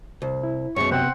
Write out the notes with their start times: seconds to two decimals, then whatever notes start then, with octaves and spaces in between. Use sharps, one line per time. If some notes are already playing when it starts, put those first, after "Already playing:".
0.22 C2
0.43 E4
0.76 F#2 B2 G#4 C#5 C#6
0.91 C3 B3 C4 F#5